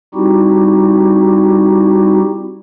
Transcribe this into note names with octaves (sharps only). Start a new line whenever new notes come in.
G3 C4 D#4 E4 F#4 G4